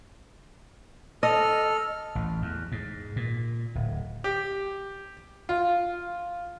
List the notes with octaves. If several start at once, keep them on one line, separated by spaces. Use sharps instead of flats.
A4 D#5 F6
A1
E2
G#2
A#2
D1
G4
F4